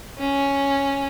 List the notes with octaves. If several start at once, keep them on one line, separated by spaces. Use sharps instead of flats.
C#4